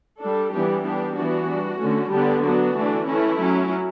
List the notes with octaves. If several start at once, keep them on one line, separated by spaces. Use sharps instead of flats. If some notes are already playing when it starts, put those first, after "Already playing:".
G3 D4 A4
E3 G3 B3 D4 G4
G3 B3 D4 G4
E3 B3 D4 F#4
G3 D4
D3 A3 C#4
D3 G3 B3 D4 G4
F#3 B3 D4 F#4
E3 A3 D4
E3 A3 C#4 E4
F#3 C#4